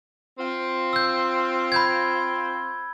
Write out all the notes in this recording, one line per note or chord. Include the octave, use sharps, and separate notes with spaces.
C4 F4
E6 G6
B5 G6 G#6